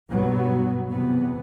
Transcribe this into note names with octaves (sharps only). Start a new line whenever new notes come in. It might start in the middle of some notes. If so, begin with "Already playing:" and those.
B1 G2 F#3 B3
E2 C3 B3